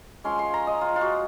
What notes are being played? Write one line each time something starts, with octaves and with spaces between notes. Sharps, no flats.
F3 G#3 C#4 C6
C6
A#5
D#5
F4
F4
F#4